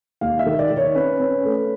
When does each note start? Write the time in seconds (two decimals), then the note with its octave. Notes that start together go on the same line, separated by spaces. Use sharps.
0.21 D#2 F5
0.39 E5
0.46 D#3
0.59 D5
0.70 D#3
0.77 C#5
0.95 C#4 B4
1.20 C#4
1.45 A3